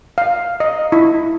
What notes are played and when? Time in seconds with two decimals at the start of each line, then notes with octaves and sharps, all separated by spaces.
0.18 F5
0.60 D#5
0.92 E4